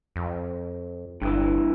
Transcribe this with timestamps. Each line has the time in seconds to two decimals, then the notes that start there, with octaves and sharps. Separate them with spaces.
0.16 F2
1.22 G1 G2 E3